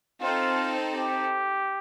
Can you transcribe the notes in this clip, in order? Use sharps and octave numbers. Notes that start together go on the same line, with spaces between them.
C4 D#4 F4 A4
G4